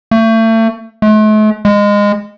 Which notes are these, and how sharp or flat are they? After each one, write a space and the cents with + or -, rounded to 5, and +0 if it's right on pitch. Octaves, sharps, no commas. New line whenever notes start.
A3 +35
A3 -45
G#3 -20